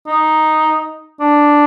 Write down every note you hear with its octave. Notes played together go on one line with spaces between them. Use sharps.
D#4
D4